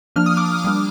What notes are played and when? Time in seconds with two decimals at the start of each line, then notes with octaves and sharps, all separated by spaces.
0.16 F3 A#3 D4 F6
0.26 D#6
0.37 D6 F6
0.64 G3 A#3 D4